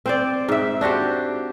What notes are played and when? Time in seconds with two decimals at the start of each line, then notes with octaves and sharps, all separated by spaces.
0.06 C4 C5 D5
0.48 G#2 E5
0.81 D4 F#4 G4 C5